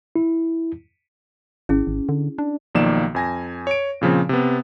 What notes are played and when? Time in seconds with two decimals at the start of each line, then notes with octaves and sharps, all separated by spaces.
0.16 E4
1.69 G#1 C#4 E4 G#4
1.87 G#1
2.09 D3
2.38 D4
2.75 B1 D#3 F3 A#3 D5 E7
3.15 F2 G#5 A#6
3.67 C#5 D7
4.01 A#2 C#3 F3 C4
4.29 C3 B3